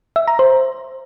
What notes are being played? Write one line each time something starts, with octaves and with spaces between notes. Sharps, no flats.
E5
A#5
C5